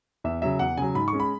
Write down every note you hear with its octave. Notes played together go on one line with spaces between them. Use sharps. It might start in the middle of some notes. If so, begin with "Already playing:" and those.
E2 E5
C#3 F#3 E5
E2 F#5
C#3 F#3 G#5
G#2 B5
C#6
G#3 C#4
B5